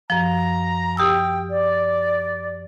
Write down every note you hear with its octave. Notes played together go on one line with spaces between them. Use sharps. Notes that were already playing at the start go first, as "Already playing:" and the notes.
F#2 F3 A#5
G4 G5 D#6 E6
D5